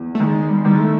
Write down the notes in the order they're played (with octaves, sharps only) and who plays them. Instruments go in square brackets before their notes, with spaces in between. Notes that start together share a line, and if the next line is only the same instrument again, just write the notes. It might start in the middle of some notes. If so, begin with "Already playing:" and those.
Already playing: [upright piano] E2
[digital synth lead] A3
[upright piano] D#3 [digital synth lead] G#3
[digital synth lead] G3
G#3
[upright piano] D#3 [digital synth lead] G3
[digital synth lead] G#3
A3